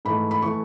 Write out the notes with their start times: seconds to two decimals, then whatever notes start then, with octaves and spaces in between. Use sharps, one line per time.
0.05 G#2 E3 A3 B5
0.31 B5
0.42 E3 A3 C#6